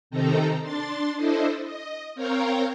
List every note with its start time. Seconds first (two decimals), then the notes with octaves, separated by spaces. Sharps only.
0.10 C3 D#3 C4 D#4 A4 A#5
0.61 D4 C6 A6
1.16 D4 E4 A4 C5 D#5
1.65 D#5
2.15 C4 A#4 C#5 F5 G5 A#5